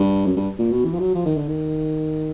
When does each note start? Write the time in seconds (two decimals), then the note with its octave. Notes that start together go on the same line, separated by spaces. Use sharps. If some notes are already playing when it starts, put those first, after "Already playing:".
Already playing: G2
0.26 F#2
0.37 G2
0.59 A#2
0.71 B2
0.85 E3
0.94 F3
0.99 F#3
1.14 F3
1.26 D#3
1.37 D3
1.48 D#3